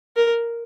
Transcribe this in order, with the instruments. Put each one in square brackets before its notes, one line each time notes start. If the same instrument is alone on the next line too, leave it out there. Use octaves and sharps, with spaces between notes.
[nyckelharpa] A#4